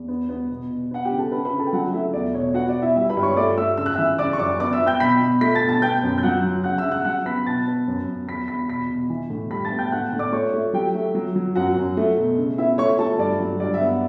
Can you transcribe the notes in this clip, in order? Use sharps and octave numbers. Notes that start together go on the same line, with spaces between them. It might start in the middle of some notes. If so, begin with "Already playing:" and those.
Already playing: E2
B3
B3
B2
B2
B3 F#5
G4 G5
C#3
A4 A5
C#3 B4 B5
B4 B5
C#3
A4 A5
G5
F#3 F#4 F#5
A3 E4 E5
E2 D5
B2 C#5
B3 F#4 F#5
D5
B2
E4 E5
G3 E4 E5
B4 B5
G2
C#5 C#6
A3 D5 D6
A3 E5 E6
C#3 E6
F#6
E5 E6
E3
C#3 D5 D6
C#6
F#2 D5 D6
B3 D5 D6
E5 E6
B3
G5 G6
B2 B5 B6
B2
A3 B5 B6
A5 A6
B2
A5 A6
B3 G5 G6
F#2
G6
F#3 F#5 F#6
F#3
C#3 F#5 F#6
E5 E6
C#3
F#5 F#6
F#3 F#5 F#6
B3 B5 B6
B2 A5 A6
B3
F#2
F#2
E2 B5 B6
E2 B5 B6
B2 B5 B6
B2
E3
A2
G3 B5 B6
A5 A6
B3
G5 G6
A2 F#5 F#6
A2
D5 D6
A3 C#5 C#6
A3
F#3 G4 G5
A3
F#3
F#3
F#2 F#4 F#5
F#2
A3
B2
C#3
B3 E4 E5
A3 C#5 C#6
A3 A4 A5
G2 D5
F#3
G2 D5
E5
B3
F#5